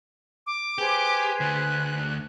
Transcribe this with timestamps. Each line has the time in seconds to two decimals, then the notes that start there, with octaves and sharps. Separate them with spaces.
0.46 D6
0.78 G4 G#4 B4 C5
1.40 D2 D3 F#6